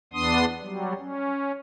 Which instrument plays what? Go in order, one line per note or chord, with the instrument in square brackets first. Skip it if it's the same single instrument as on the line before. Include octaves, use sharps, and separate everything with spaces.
[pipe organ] E2 B3 D4 C6 D#6
F#3 G3
C#4